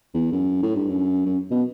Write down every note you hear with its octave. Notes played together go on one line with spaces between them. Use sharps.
E2
F#2
A2
G2
F#2
F#2
B2